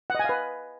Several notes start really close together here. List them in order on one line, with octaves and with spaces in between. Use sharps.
F#5 D#5 G#5 F5 B4